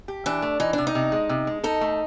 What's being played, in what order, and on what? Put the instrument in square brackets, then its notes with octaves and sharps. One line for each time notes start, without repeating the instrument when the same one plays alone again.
[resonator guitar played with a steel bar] G4
[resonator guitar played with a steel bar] E3 [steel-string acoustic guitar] D4
[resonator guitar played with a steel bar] A3
[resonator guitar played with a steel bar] E3 [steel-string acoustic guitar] D#4
[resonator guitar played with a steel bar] C3 [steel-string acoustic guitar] D4
[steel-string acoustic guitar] D#4
[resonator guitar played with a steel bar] C3
G#3
C3
G#3
[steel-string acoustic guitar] D#4 [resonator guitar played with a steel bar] A4
[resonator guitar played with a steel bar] A3